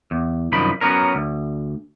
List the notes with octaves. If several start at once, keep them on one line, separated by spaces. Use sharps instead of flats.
E2
C2 F#2 D#3 F3 B5
F#3 B3 C#4 A#4
D2